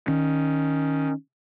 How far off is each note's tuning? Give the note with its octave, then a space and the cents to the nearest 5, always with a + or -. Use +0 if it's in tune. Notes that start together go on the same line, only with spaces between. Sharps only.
D#3 +5 C#4 +0